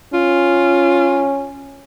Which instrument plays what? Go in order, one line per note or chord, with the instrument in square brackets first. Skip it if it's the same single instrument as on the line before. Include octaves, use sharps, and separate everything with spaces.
[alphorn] C#4 [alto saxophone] F4